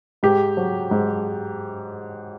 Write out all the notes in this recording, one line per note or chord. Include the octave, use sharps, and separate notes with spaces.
G#2 G4
F#3
G#2